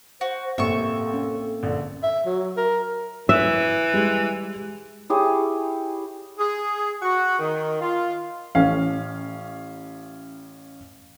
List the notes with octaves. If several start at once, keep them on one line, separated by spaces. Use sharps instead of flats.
F#4 C5
A1 C3 A#3 C4 A4 E5 C#6
C#4
A#1 D3
E5
F#3
A#4
E3 E5
G3 G#3
E4 G4 G#4 C#5
G#4
F#4
D#3
F4
A1 C#4 F5